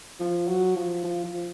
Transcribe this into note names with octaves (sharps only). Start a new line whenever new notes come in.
F3
F#3
F3
F3
F3